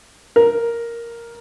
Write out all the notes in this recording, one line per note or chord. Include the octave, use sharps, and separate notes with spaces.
A#4